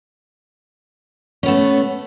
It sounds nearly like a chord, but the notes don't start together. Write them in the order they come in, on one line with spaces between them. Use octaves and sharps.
C#4 B3 A3